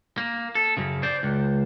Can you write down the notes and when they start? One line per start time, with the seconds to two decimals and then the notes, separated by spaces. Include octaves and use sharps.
0.18 A#3
0.55 A4
0.77 F#2 C#3
1.03 C5 D5
1.23 C#2